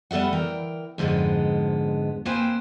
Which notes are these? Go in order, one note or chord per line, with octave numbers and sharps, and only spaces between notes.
G3 B3 A4 E5 F#5
E3 A#4 G5
F2 G#2 D3 G#3 B3
A#3 C4 B4 C5 G5 G#5